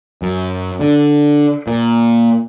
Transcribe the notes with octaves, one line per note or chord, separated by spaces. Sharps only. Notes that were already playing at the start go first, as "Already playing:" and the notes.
F#2
D3
A#2